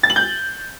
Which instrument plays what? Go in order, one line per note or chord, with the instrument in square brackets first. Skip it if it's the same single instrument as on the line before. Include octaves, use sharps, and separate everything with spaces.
[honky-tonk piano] A6
F#7
G6